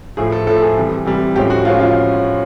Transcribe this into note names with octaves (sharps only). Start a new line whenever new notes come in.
A2 F3 A3 G#4
A4
A2 F3 A3 A4
G#4
C3 E3 G3
C3 E3 G3
A2 F3 G#3 C#4 G4
F#4
A2 F3 G#3 C#4 F4
F4